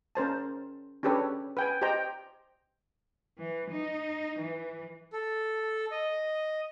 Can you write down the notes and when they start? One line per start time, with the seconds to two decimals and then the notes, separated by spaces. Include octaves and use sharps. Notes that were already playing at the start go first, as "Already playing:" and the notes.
0.15 C#4 A#4 C5 A5
1.03 C#4 D4 G4 A4 B4 C#5
1.57 B4 G5 G#5
1.82 G4 C5 D#5 G5 A#5
3.38 E3
3.70 D#4
4.39 E3
5.13 A4
5.91 D#5